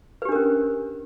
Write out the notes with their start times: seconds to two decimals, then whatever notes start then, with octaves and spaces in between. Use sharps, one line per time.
0.22 B4
0.25 G4
0.29 D4
0.32 A#4
0.35 C#4